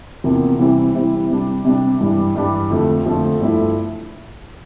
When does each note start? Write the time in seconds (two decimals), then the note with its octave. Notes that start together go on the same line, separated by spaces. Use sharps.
0.24 E2 C3 F3 A#3
0.59 C3 E3 G3 C4 E4
0.94 C3 E3 G3 C4 E4
1.29 C3 G3 D4
1.65 C3 G3 D4
1.99 G2 E3 G3 D4
2.35 G2 E3 G3 D4
2.70 F2 D3 F3 A3
3.06 F2 D3 F3 A3
3.41 G2 F3 A3 E4